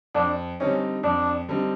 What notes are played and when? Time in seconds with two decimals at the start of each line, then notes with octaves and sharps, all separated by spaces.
0.14 F2 D4
0.60 D3 G3 C4 C#4 D#4
1.03 F2 D4
1.48 D3 G3 C4 D#4